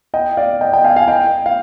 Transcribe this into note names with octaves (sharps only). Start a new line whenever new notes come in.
D#5 G5
D5 F5
D#5 G5
D#5 G5
F5 G#5
F5 G#5
D#5 G5
F5